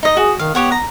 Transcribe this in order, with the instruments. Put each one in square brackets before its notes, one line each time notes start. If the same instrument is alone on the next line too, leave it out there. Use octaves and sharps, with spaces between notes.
[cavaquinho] D#4 D#5
[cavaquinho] F#4 [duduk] G#4
[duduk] D#3 [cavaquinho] F5
[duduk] B3 [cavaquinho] G4 C#5 F#5
[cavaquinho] A#5